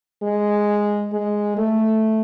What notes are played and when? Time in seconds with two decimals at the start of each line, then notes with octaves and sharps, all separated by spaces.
0.23 G#3
1.13 G#3
1.57 A3